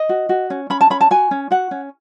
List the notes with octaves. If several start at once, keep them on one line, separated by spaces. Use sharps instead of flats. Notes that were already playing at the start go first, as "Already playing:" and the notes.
Already playing: D#5
F#4
F#4
C#4
C#4 B5
A5
C#4 B5
A5
F#4 G#5
C#4
F#4 F#5
C#4